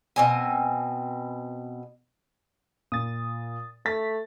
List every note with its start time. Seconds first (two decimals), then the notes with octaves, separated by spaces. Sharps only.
0.16 B2 C4 G#5
2.92 A#2 D#6 A6
3.86 A3 A6 B6